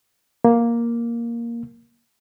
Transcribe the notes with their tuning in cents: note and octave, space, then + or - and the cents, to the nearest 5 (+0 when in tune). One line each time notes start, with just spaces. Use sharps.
A#3 +5